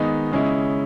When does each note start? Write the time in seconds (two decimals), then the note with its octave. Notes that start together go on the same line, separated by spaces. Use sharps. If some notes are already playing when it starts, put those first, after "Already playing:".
Already playing: D#3 G#3 B3 D#4
0.32 C#3 G#3 C#4 E4